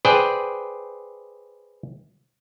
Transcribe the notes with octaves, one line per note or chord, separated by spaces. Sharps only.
G#4 B4 C5 D5 G5